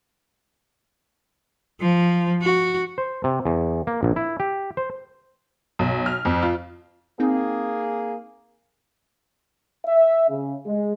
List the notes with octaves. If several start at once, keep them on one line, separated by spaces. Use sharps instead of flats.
F3
F#4
C5
C3
E2
A#3
A#1
E4
G4
C5
B1
F6
F2
F4
A#3 C4 D#4 G#4 G5
E5
C#3
G#3